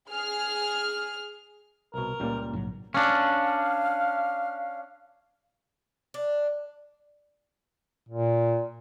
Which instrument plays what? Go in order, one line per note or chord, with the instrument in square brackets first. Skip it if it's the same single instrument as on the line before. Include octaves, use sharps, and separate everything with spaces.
[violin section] G#4 F6
[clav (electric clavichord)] C2 B2 [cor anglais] A#4
[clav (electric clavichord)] C#2 A#2 G3 [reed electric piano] C#3 A#3
[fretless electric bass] A#1 G#2 F#3
[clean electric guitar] C#4 D4 [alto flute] F5
[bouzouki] D4
[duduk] A#2